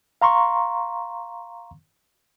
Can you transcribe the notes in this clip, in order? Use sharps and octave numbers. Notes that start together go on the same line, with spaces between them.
F5 A#5 C6 C#6